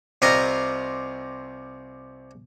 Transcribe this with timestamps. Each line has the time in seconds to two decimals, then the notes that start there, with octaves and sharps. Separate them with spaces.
0.22 C2 C3 F4 A#4 D#5 A#5